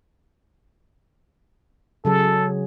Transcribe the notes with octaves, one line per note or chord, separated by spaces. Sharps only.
C#3 F#3 G#4 A4